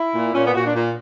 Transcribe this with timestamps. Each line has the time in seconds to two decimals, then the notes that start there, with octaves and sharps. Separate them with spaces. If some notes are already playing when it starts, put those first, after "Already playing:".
Already playing: E4
0.13 A#2
0.34 A#2 C#4
0.44 B3
0.54 A#2 F#4
0.65 D4
0.74 A#2